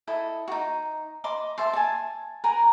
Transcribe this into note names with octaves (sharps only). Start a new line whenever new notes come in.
E4 A4 D#5
D#4 F#4
D#5 B5 C6 D6
E5 A5 C6
G#5 A5
A#4 B4 G#5 A#5